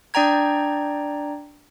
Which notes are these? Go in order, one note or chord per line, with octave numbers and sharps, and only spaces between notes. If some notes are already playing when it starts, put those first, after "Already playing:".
D4 D5 G5 A#5 G#6